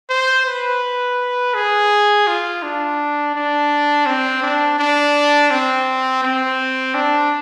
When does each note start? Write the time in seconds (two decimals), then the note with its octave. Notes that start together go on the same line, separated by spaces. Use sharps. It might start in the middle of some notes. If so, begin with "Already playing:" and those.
0.10 C5
0.46 B4
1.54 G#4
2.27 F4
2.63 D4
3.35 D4
4.06 C4
4.42 D4
4.79 D4
5.51 C4
6.23 C4
6.94 D4